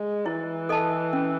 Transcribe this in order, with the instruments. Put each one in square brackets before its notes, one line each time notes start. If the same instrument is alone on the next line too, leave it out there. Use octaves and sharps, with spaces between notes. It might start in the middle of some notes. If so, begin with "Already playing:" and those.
Already playing: [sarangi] G#3
[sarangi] E3 [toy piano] E4
[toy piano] A4 D#5 A5
C#4